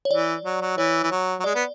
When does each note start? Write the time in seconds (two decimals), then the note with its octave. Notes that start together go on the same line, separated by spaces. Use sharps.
0.05 C#5
0.11 E3 D5
0.45 F#3
0.61 F#3
0.77 E3 C#5
1.03 E3
1.11 F#3
1.40 F#3
1.44 G#3 D5
1.55 B3